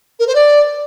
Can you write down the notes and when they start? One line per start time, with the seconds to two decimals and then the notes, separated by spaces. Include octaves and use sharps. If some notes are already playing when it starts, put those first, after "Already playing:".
0.19 A#4
0.27 C5
0.35 D5